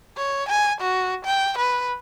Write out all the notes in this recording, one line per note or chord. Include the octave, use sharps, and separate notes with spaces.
C#5
G#5
F#4
G5
B4